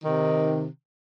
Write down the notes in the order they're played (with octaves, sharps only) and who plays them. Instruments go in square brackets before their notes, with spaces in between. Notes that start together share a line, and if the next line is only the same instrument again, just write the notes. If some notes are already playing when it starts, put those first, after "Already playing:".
[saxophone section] C3 D#3